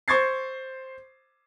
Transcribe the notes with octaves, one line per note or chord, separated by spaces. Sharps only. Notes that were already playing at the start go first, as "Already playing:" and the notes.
C5 C#6 G#6 A6 C7